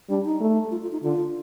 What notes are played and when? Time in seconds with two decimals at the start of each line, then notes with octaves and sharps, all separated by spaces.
0.09 G3 D4
0.25 D#4
0.40 A3
0.71 F4
0.82 F4
0.92 D#4
1.03 D3 F4